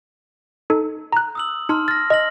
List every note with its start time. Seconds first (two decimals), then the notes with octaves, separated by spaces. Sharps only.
0.70 D#4 A4
1.12 A#5 F#6
1.35 D#6 E6 F#7
1.69 D#4 A5 C6 F6
1.88 F6 A6 A#6
2.10 D#5 F6 A#6 F#7